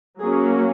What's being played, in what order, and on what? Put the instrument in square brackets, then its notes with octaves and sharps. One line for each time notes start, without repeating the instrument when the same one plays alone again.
[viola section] F#3 A#3 C#4 G#4